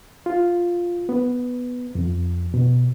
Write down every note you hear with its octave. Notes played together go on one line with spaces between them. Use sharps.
F4
B3
F2
B2